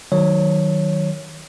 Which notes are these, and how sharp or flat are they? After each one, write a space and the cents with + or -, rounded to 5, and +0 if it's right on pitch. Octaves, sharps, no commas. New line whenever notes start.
D#3 +0 F#3 +0 C#5 +0